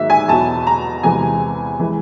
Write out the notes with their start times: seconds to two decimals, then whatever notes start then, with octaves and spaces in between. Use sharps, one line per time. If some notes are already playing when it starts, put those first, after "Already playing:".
Already playing: G#2 D#3 F#3 A#3 E5
0.10 G#5
0.28 E2 B2 F#3 A5
0.67 A#5
1.03 E2 C3 E3 G#3 G#5
1.79 E3 G#3